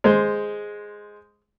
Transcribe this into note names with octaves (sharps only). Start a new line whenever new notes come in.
G#3 C5